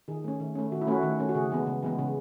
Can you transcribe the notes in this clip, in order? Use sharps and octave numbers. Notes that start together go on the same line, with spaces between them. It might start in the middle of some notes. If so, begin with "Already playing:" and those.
D#3 G#4
A3 C#4
D#3
A3 C#4
D#3 F#4
E4
A3 C#4 F#4
D#3
A3 C#4
F#4
C#3 G#4
E3 G#3 B3
C#3
E3 G#3 B3
C#3